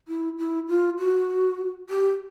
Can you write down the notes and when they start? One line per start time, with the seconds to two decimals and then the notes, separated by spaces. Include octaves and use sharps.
0.08 E4
0.38 E4
0.68 F4
0.99 F#4
1.90 G4